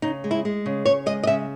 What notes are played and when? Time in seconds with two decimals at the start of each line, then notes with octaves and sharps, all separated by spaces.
0.02 C#3 D#4
0.24 G#3
0.31 E4
0.45 G#3
0.66 C#3
0.85 C#3 C#5
1.06 G#3 D#5
1.23 D#5
1.27 C#3 E5